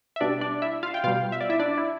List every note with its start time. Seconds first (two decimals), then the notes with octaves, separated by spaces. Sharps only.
0.16 E5
0.21 B2 G3 D4 D5
0.41 D4 D5
0.62 E4 E5
0.83 F4 F5
0.94 G5
1.04 B2 G3 F4 F5
1.32 E5
1.41 D5
1.50 E4 E5
1.59 D4 D5
1.78 E4